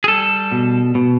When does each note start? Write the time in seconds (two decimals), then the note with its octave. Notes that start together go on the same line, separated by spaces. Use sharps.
0.04 G#4
0.08 G3 A4
0.52 B2
0.95 B2